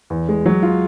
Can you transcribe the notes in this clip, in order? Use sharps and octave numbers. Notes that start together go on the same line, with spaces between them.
E2
G#3
F#3
F4